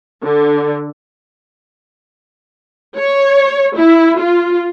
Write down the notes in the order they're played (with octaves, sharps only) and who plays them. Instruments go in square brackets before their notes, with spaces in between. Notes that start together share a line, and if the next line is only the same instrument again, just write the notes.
[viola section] D3
C#5
E4
F4